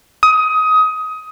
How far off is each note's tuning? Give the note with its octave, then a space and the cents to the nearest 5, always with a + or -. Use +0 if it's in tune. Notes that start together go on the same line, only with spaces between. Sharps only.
D#6 +20